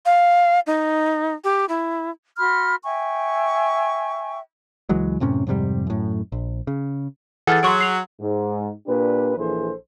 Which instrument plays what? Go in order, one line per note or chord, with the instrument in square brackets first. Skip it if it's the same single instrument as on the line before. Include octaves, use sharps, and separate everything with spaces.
[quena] F5
D#4
G4
E4
[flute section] F#4 B5 C6 F6
E5 G5 G#5 C#6
[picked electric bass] C#2 E3 F#3 G#3
F#2 A2 C3 C#4
F2 G#2 C3 G3
F#2 A2
A#1
C#3
[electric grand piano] E3 G#4 A4 [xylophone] F#5 F6 A6
[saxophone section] F#3 [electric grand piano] G#4 [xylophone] C6 C#6 D7
[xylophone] C7 F7
[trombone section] G#2
A#2 D4 G4 B4
A#1 E3 G#4 A4 C5